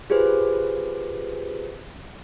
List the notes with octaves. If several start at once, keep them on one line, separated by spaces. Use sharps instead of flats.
F4 G4 G#4 B4 C5